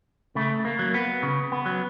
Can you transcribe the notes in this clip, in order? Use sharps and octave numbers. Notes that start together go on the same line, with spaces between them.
C#3 A3
A#3
F#3
B3
C#3
B3
F#3